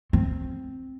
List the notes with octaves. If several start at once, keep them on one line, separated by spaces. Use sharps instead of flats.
C4